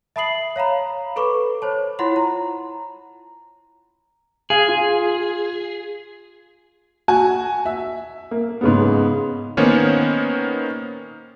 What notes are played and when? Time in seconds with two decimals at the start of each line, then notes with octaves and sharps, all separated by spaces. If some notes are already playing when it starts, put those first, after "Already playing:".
0.16 E5 A5 B5 D#6 C7 F#7
0.56 C#5 F5 A#5 B5
1.16 A4 B4 B5 C#6 D6
1.62 C5 C#5 A5
1.99 E4 F4 C#5 F#5 B5 C6
2.16 A#5
4.50 G#4 F5
4.68 F4
7.08 F#4 G#5
7.66 E5
8.31 A#3
8.61 G#2 C#3 B3
9.57 D#3 A#3 B3 C#4 C5 C#5